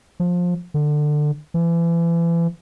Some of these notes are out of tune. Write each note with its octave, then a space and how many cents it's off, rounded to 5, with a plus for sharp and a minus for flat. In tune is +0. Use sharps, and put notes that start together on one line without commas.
F3 +20
D3 +20
E3 +35